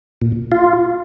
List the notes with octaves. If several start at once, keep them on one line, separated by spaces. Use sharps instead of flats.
A#2
F4